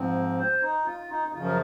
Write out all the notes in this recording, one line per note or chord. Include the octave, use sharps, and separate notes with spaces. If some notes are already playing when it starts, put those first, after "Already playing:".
Already playing: G#2 F3 C4
C5
D#4
F4
D#4
D#4
F#2 C#3 F3 F4
A#4